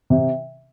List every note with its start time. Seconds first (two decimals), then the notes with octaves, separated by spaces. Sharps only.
0.10 C3